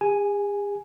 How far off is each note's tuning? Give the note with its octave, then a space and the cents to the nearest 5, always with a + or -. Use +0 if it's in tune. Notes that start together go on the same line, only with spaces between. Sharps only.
G#4 -45 G#5 +0